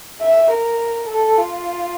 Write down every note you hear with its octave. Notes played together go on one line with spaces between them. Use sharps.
E5
A#4
A4
F4